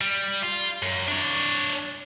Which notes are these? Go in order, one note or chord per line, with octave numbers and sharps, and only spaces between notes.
G3
F4
F#2
D4 C#5